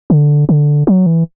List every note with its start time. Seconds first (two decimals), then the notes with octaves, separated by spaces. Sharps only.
0.10 D3
0.49 D3
0.87 F#3
1.06 E3